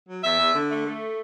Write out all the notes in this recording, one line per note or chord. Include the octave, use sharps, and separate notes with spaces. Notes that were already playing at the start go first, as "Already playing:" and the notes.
F#3
E2 E5
E2
D3
A3
A3